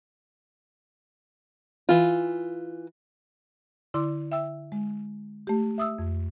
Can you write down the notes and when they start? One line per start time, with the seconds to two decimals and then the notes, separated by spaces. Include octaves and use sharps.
1.89 E3 F4
3.94 D3 E4 D5 C6 D6
4.32 E5 G5 E6
4.72 G#3
5.47 A3 G4
5.78 E5 D#6 E6
5.99 F2